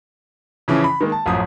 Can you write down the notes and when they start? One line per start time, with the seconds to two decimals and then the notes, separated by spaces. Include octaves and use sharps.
0.68 C#3 E3 F3 C#4
0.84 B5
1.01 D#3 G#3 A#3
1.12 A5
1.26 A1 F#2 F3 D#6